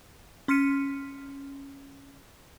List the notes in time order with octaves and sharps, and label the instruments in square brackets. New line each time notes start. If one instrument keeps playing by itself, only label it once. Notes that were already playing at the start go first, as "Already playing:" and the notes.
[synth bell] C#4 C6 F6 B6 C#7 D#7